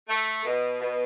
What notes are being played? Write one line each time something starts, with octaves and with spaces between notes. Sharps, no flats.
A3
B2
B2